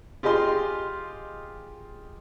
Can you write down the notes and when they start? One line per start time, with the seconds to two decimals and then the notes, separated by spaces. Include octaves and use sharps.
0.23 F4 G4 G#4 D#5 C6